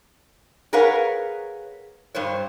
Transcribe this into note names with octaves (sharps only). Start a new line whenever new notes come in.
G#4 A#4 B4 C#5 F5 F#5
G2 C5 C#5